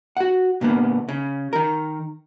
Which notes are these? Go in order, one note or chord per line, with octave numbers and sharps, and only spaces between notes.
F#4 F#5
A#2 D3 A#3 B3
C#3
D#3 A#4